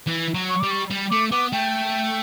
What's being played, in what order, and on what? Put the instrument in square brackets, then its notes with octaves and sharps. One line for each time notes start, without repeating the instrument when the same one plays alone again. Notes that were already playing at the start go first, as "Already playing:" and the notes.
[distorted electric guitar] E3
F#3
[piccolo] C#6
[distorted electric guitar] G3 [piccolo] D6
[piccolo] C#6
[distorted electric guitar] G3
[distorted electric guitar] A3 [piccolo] D6
[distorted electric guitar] B3 [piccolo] D6
[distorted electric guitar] A3 [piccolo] G5